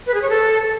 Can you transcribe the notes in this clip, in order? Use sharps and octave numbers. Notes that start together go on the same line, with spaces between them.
B4
G#4
C#5
A4